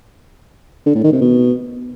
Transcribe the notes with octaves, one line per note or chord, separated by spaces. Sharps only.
D3
A2
D#3
C3
B2